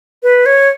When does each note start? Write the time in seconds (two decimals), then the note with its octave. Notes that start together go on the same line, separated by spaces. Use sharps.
0.23 B4
0.46 C#5